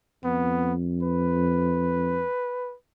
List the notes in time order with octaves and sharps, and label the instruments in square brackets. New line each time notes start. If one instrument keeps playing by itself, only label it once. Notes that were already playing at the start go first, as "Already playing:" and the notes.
[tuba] F2 [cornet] B3
[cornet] B4